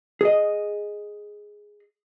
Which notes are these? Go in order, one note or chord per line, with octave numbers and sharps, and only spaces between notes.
G#4 D#5